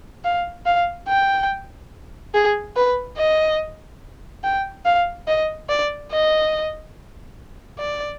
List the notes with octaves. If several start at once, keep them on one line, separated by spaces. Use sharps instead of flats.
F5
F5
G5
G#4
B4
D#5
G5
F5
D#5
D5
D#5
D5